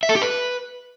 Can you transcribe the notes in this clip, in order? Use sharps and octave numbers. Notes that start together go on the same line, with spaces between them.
E5
A4
G4
B4